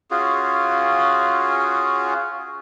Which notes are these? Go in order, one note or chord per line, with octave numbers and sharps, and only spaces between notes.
C#4 F4 F#4 G#4